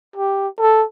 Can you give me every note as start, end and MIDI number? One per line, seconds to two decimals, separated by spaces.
0.16 0.48 67
0.60 0.85 69